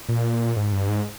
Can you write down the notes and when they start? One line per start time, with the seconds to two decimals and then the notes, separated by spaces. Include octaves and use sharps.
0.09 A#2
0.57 G#2
0.72 G2
0.88 G#2